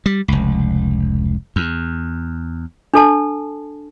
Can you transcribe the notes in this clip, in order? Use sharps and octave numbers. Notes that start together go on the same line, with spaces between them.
G3
F1 C#2
E2
D4 A4 A5